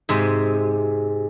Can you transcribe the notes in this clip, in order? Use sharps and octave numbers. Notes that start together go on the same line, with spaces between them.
G#2 C3 G#3